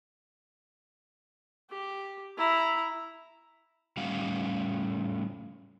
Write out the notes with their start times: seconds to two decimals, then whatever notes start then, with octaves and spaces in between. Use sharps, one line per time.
1.70 G4
2.37 E4 A#5
3.97 A2 G3 C#4 F5 F#5